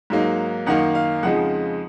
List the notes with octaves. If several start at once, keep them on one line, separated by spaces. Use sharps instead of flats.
G#2 F#3 A#3 D#4
F#2 D#3 A#3 D#4 F#5
F5
F2 C#3 F3 G#3 D#4 F#5